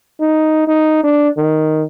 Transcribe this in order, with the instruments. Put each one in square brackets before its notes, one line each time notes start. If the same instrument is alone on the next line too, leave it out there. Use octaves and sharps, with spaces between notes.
[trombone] D#4
D#4
D4
D#3